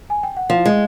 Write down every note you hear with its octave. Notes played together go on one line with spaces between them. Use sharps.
G#5
G5
F#5
F3 F5
G#3